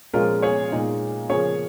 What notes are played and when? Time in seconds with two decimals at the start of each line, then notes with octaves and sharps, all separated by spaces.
0.14 A#2 F3 G#3 C#4 F4 A#4
0.42 G#4 C#5
0.72 A#2 G#3 D#4
1.29 C#3 F3 A#3 C#4 G#4 C#5